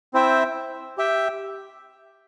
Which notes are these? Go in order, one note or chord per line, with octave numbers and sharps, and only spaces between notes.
C4 E4 C5 E5 G5
G4 E5 G5